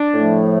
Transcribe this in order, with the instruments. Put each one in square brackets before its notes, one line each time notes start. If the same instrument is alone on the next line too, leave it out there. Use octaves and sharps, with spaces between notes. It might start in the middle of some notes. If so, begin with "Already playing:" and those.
Already playing: [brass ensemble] D4
[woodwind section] A2 F3 A3